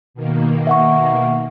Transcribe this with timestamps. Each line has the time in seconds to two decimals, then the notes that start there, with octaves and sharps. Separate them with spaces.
0.14 B2 D#3 A#3
0.67 E5 F#5 C#6